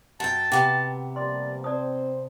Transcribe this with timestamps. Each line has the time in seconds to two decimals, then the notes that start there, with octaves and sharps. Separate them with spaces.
0.20 F#2 G5 A5
0.52 C3 B3 F#4 G5 D6
1.16 F3 G3 A#3 D5 C6
1.64 C4 C5 D5 A5 D#6